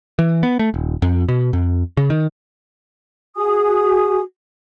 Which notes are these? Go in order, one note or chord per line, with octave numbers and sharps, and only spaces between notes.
E3
B3
A3
D#1
F2
B2
F2
C#3
D#3
F#4 G#4 G#5 D#6